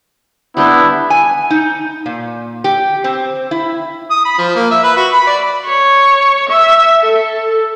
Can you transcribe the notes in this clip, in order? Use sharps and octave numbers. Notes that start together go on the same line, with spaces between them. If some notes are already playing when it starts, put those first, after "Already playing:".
G3 B3 D4 E4 G4
G#5
D#4
A#2
G4
C4
E4
D#6
B5
F3
A#3
E5
B4
F#4
B5
D5
C#5
E5
A4